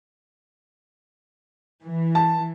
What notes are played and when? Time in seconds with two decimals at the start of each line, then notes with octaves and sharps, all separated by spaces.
1.84 E3
2.15 A5